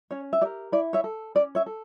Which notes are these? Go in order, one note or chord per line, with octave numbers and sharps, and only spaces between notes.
C#4 C#5
E5
G4 A#4 D5
E4 D5
C#5 E5
A4
C#4 D5
C#5 E5
A4